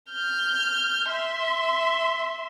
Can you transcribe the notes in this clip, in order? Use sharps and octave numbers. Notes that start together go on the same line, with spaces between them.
F6 G6
E5 C6